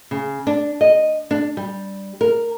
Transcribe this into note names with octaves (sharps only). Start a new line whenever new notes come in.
C#3
D4
D#5
D4
G3
A#4